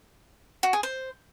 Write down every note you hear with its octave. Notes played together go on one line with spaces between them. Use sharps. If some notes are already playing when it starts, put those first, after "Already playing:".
F#4
G#4
C5